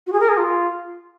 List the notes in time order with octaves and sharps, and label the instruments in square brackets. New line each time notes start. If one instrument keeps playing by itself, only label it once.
[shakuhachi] F#4
G#4
A#4
G#4
F4